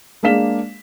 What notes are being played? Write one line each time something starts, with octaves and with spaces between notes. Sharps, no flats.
G#3 A#3 D4 F5 B6 E7